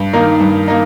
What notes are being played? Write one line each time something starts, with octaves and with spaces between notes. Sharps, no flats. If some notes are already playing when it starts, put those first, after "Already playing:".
Already playing: G2
D#3 A#3 D#4
G2
A#3 D#4